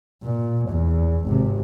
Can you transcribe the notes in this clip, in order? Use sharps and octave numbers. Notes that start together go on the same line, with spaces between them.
A#2
E2
G#1 C3